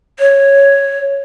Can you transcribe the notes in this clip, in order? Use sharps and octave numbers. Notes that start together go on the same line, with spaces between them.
C#5